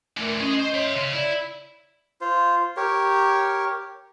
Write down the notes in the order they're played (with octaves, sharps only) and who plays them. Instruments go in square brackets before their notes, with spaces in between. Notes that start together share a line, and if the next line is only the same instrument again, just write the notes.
[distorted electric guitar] D3 E3 [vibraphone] A3 A#4
[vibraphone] C#4 [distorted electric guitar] G#4 D#5
[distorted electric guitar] C5 C6 [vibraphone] D#5
[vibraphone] C#5 [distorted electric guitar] E5 C6
[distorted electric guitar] C#3 C#4
[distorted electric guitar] E4 [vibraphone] D5
[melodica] F4 C5
G4 A#4 C#5